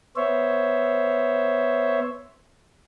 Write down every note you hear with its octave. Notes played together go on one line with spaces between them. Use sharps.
B3 C5 C#5 E5